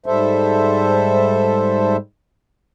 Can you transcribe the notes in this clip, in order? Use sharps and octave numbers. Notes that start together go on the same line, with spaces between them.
G#2 G3 A4 C5 E5